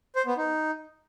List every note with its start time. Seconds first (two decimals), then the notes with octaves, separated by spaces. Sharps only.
0.16 C5
0.26 B3
0.37 D#4